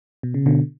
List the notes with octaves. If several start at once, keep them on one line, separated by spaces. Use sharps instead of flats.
B2
C#3
B2 D3